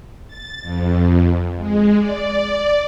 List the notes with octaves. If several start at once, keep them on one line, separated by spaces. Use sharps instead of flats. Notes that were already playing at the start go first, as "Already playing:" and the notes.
A6
F2
G#3
D5